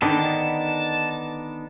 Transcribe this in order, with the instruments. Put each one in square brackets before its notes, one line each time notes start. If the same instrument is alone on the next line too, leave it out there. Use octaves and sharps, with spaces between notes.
[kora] D3 D#3 [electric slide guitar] B3 D4 D#4 [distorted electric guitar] A5